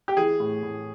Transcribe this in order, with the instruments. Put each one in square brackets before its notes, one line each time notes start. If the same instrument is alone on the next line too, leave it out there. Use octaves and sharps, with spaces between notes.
[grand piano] G4
E3 G#4
A2
A2